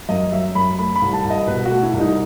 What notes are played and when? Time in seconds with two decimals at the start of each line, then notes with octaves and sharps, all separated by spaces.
0.09 F#2 D#5
0.32 F#3 E5
0.55 F#2 B5
0.78 A3 B5
0.96 B5
1.02 C2
1.13 A5
1.24 C2
1.30 D#5
1.47 B2 B4
1.65 F#4
1.71 A3
1.83 E4
1.93 C2
2.00 D#4